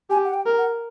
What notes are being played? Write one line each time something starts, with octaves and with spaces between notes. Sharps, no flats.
G4 G#5
F#5
G5
A#4
F#5